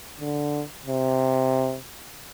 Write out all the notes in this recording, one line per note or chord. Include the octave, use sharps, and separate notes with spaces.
D3
C3